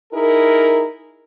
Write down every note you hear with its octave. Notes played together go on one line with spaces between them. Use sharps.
D#4 E4 G#4 A#4